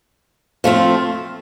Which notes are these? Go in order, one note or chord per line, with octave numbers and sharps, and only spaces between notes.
F3 A3 C4 F4